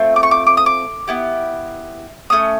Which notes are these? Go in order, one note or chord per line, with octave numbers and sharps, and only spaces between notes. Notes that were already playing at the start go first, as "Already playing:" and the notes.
Already playing: A3 C4 F4
D6
C#6
D6
D6
D#6
D6
B3 E4 G4
A3 C#4 D#6